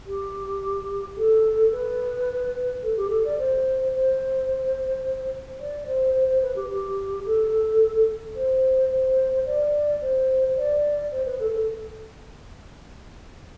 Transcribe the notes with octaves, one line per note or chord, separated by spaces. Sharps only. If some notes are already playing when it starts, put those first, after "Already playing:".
G4
A4
B4
A4
G4
A4
D5
C5
C5
D5
C5
C5
C5
B4
G4
G4
A4
C5
C5
D5
C5
C5
D5
C5
B4
A4
A4